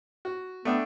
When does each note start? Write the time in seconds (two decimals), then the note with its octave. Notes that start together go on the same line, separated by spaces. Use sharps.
0.25 F#4
0.65 A3 B3 D4 G5